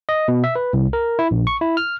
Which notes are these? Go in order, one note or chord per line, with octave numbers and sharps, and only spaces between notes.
D#5
B2
E5
B4
C2
A#4
E4
A#1
C#6
E4
F6